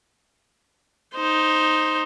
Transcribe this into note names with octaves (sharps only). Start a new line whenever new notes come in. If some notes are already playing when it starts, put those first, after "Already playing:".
D#4 C5